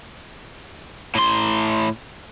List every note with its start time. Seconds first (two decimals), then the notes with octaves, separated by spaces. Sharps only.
1.15 A2 C6